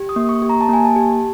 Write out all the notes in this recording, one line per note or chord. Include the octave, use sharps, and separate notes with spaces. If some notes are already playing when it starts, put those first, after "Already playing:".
Already playing: G4
D#6
A#3
C#6
G4
A#5
A5
A#3 G#5
A5
G4